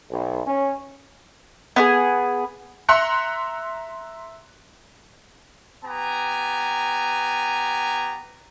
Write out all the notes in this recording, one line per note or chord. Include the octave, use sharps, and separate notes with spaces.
B1
C#4
B3 D4 G#4
E5 A#5 C6 F#6 C#7
B3 G4 G#5 A#5